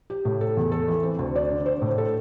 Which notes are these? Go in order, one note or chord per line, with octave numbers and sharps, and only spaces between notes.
G4
A2
A4
E2
A4
E3
C4
D2
D5
D3
C5
A2
A4